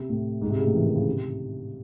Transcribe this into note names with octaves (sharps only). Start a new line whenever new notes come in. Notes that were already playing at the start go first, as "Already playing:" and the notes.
Already playing: C3
A2
G#2
C3
C#3
A2
E3
D#3
C#3
C3